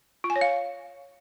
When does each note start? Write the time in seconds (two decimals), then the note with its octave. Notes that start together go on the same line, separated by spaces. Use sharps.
0.24 F4
0.30 G#5
0.36 C#5
0.41 F5